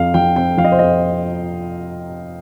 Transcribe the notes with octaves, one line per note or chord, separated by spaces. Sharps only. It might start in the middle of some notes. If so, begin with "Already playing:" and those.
Already playing: F2 F3 F5
F3 G5
C4 G5
F3 F5
D#5
C5
F2 D#5